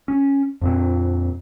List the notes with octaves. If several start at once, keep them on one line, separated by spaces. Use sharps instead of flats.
C#4
F2 A#2 C4